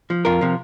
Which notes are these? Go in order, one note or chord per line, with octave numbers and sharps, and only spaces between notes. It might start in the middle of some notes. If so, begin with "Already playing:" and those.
F3
F2 F4 A#4
C3 F3